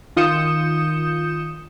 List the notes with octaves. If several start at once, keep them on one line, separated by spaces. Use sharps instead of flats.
D#3 F4 D#6 G6 C#7 E7